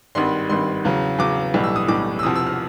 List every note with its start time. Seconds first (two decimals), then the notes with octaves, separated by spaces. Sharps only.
0.15 G#1 G2 D#3 G3 C6
0.49 G#1 G2 D#3 G3 C6
0.85 E2 C#3 F#3
1.18 E2 C#3 F#3 D6
1.54 B1 A2 E3 G3
1.64 E6
1.76 D#6
1.88 B1 A2 E3 G3 D6
2.19 E6
2.23 E1 E2 C3 F3 D#6
2.35 E6
2.47 F6